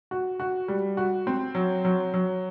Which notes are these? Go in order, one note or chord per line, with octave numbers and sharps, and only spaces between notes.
F#4
F#4
G3
F#4
C4
F#3
F#3
F#3